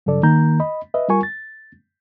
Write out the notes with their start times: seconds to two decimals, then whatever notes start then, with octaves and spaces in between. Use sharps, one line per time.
0.06 G2 C#3 F#3 A4 D5
0.23 D#3 A#3 A#5 G6
0.60 D#5 B5
0.94 B4 D#5 E5
1.08 G3 F4 A#4 G#5 C#6
1.23 A6